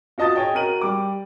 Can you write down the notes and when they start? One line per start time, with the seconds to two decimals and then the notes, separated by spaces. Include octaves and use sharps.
0.18 F4 F#4 D#5 A5 D#6 A6
0.36 G#4 C#5 D#5 G5
0.54 F#4 A#4 D#7 F#7
0.81 G3 D6